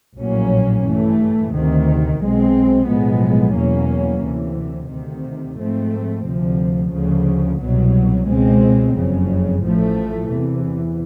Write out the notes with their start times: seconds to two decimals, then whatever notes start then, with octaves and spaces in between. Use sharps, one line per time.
0.17 A#1 A2 F#3 A#3 C#4
0.85 G2 E3 A3
1.53 D2 C3 D#3
2.19 B1 B2 G#3 C4
2.87 B1 A2 F3 G#3 B3
3.55 E2 B2 F#3 A#3 C#4
4.22 D2 C3 E3
4.89 D2 C3 D#3
5.57 G#2 F3 A3 C4
6.25 D2 C3 F3
6.92 D2 C#3 F3
7.59 C2 B2 F#3
8.26 C#2 B2 G#3 C4
8.95 F#1 F2 C#3
9.61 A1 A2 F3 A3
10.29 E2 C3 E3